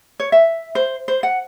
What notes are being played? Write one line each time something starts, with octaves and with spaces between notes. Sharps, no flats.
C#5
E5
C5
C5
F#5